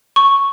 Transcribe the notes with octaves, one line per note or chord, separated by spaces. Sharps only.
C#6